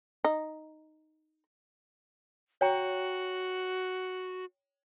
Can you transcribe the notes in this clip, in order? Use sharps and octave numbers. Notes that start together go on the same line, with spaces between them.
D#4
F#4 C#5 G5 A#5